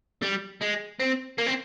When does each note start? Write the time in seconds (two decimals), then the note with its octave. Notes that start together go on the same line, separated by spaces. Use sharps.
0.22 G3
0.61 G#3
0.99 C4
1.38 A#3
1.47 C4